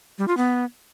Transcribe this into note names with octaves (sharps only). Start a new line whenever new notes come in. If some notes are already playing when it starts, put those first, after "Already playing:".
G3
F4
B3